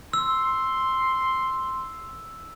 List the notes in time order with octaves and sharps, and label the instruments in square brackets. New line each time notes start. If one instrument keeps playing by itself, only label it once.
[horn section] C6 [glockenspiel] E6